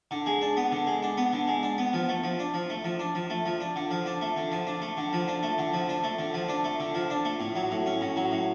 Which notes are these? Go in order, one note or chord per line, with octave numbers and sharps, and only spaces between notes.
D3
G#3
D4
B3
D3
G#3
D4
B3
D3
G#3
D4
B3
F3
A3
F3
D4
F3
A3
F3
D4
F3
A3
F3
D4
D3
F3
D4
A3
D3
F3
D4
A3
D3
F3
D4
A3
D3
F3
D4
A3
D3
F3
D4
A3
D3
F3
D4
A3
A2
F#3
A2
C#4
A2
F#3
A2